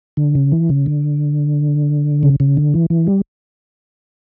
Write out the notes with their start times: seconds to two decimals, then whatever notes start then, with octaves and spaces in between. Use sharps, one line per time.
0.17 D3
0.35 C#3
0.52 E3
0.69 C#3
0.86 D3
2.23 C#3
2.40 C#3
2.57 D3
2.74 E3
2.90 E3
3.07 G3